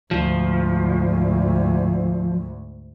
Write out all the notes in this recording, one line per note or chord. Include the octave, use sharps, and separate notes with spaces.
D2 G#2 F3